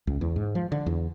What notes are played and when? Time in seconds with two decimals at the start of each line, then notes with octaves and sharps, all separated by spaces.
0.07 C#2
0.21 E2
0.36 G#2
0.55 F3
0.72 D3
0.86 E2